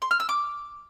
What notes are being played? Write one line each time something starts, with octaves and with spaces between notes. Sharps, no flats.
C6
F6
E6
D6